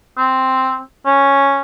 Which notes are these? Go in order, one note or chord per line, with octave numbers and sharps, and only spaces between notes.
C4
C#4